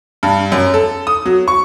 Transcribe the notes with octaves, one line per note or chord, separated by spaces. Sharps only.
G2
F#2
A4
D#6
F#3
C#6